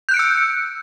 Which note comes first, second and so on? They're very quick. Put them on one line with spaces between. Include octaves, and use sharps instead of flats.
G6 F#6 D7 C#7 E6